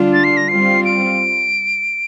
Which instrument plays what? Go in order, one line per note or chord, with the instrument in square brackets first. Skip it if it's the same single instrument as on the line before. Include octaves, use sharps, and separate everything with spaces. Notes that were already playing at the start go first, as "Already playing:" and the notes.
Already playing: [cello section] D3 G3 D4 F4
[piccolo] A6
C7
A#6
[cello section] G3 C4 F4 [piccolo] C7
[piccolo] D7